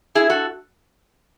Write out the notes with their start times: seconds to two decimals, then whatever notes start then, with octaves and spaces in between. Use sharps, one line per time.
0.15 E4 G#4
0.30 F#4 A4